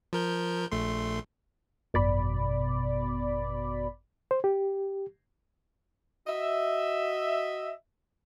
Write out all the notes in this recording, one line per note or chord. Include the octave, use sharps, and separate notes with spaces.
F3 A#4 G6
A#1 A3 C6
G#1 F#2 B2 D5 B5
C5
G4
F#4 D#5 E5